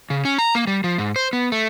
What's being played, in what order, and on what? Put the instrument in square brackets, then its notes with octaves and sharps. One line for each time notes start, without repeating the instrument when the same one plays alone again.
[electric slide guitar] C#3
C#4
A#5
A#3
G3
F3
G#2
C5
B3
A3